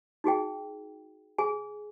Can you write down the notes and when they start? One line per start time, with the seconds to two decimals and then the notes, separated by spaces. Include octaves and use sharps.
0.24 D#4 F#4 G#4 G5
1.38 G#4 G#5